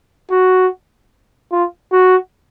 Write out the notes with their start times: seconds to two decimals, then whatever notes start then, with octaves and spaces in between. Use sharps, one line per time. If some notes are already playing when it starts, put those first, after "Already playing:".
0.31 F#4
1.52 F4
1.92 F#4